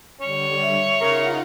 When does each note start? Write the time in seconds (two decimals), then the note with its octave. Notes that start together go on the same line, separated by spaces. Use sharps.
0.21 D3 G3 C#5
0.62 E5
1.00 C#3 D#4 F4 A#4 F#5